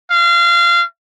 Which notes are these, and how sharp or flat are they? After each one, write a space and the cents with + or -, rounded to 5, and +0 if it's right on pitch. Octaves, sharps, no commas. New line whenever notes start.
F5 -25